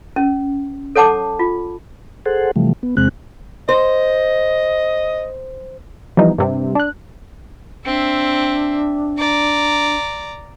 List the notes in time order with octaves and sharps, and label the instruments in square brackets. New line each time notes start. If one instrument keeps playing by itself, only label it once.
[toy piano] C#4
A4 C#5 F#5 A5 D6
F4
[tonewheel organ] G#4 A4 C5 F#5
C3 E3 F3 G3 A3
B3
E2 C3 G#3 C4 F#6
[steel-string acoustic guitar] C5 [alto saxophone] D#5
[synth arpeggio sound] E3 F3 G3 B3 D#4
G2 C3 G3
D4 F#6
[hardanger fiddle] C4 E5 [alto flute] D4
[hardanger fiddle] D5 A#5